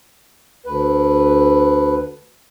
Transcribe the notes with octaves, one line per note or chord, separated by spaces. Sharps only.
D2 B4